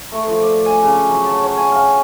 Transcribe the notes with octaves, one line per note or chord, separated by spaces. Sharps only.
A3
F3
D5
G#5
C#3
F#3
A5
C#5
G#5
F5